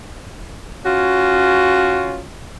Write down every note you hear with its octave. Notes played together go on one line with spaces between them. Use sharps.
C#4 F4 F#4